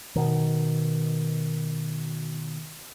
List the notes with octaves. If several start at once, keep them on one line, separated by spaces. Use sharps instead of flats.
B2 D#3